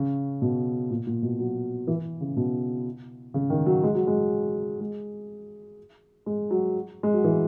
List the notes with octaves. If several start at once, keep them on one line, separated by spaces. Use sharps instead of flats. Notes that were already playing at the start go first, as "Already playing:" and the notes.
Already playing: C#3
B2
A#2
A#2
B2
F#3
E3
C#3
B2
C#3
D#3
F#3
G#3
F#3
G#3
G#3
G#3
F#3
G#3
F#3
E3